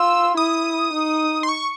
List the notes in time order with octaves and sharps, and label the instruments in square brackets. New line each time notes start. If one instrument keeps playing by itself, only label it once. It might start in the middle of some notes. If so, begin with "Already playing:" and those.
Already playing: [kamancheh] F4 [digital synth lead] E6
[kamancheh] E4 [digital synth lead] D#6
[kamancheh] D#4
[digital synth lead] C6
C#6